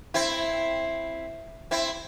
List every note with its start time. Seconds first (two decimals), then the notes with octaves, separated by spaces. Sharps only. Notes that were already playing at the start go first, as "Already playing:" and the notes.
0.14 C4 E4
1.71 C4 E4